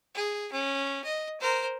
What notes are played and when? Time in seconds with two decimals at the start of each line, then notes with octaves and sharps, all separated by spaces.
0.15 G#4
0.52 C#4
1.04 D#5
1.41 A#4 C5